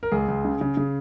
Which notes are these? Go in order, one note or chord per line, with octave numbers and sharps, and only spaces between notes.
A#4
C#2 G#4
C#2
C#3
C#3
C#3